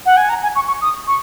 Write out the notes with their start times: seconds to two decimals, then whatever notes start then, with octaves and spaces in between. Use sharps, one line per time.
0.05 F#5
0.17 G#5
0.29 A#5
0.42 G#5
0.55 C#6
0.67 C#6
0.81 D#6
1.07 C#6